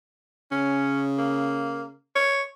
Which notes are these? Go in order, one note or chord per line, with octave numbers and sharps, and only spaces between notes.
C#3 C#4
A#3
C#5